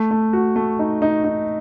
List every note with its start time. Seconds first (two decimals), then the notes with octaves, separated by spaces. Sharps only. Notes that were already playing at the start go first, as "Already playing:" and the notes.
Already playing: A3
0.11 A3
0.33 F#4
0.56 A3
0.79 D#4
1.02 D#4
1.24 D#4